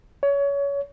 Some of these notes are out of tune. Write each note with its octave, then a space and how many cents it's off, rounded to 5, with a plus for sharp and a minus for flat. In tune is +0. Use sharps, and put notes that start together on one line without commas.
C#5 +25